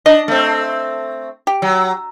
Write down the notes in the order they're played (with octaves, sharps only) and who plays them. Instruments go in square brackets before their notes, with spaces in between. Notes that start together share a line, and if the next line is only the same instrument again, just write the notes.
[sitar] D4 [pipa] D#5
[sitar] A3 C4
[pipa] G4
[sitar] F#3